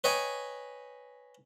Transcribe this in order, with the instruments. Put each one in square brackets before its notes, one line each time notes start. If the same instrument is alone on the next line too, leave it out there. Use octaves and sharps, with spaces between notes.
[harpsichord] B4 C#5 D#5 G5 G#5